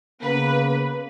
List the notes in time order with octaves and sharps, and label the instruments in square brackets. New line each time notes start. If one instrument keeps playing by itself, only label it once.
[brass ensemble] C#3 A#3 B3 [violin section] B4